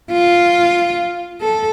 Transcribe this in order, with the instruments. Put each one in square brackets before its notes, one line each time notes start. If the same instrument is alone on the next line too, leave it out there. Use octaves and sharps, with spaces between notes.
[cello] F4
A4